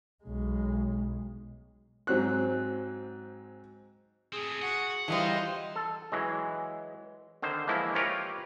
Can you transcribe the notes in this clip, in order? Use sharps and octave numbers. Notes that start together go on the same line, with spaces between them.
B1 G#3
G#2 F#3 C4 F#6
A2 C4 G#4
F#4 F#5
E3 G3 D#4 F4 C5 D#5
A4
E3 F#3 G#3
D3 D#3 C5
E3 F3 G#3 A#3 E4
F4 G4 A#4 B4 C#5